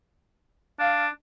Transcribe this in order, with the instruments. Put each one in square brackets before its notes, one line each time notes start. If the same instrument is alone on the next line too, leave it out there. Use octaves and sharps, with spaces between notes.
[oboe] D4 [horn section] F5